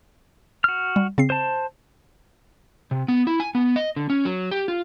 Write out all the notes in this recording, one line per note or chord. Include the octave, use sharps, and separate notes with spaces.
F#4 F6
G3
C#3 C4 C7
C5 A5
C3
B3
E4
G#5
B3
D#5
D3
C#4
F#3
G4
F4